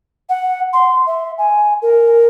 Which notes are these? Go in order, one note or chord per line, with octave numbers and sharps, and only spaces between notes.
F#5
C6
E5
G#5
A#4